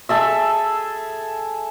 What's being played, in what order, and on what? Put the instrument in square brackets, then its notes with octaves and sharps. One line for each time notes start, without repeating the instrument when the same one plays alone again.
[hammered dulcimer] G#4 A4 E5